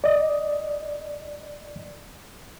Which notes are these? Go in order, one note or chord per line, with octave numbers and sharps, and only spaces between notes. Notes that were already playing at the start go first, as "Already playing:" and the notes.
D5 D#5